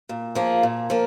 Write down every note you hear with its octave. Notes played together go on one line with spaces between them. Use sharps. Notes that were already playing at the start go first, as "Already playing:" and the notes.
A#2
F3 A#3 F4 G#4
A#2
F3 A#3